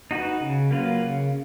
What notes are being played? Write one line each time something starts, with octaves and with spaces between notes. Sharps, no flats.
D#4 F#4 B4
C#3
F#3 A#3 F4 B4
C#3